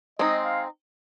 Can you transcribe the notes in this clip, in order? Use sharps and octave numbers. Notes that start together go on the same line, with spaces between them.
G#3 C4 D#4 D#5
F5